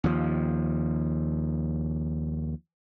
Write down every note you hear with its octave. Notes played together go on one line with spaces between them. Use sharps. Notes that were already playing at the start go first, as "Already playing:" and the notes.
D#2 F3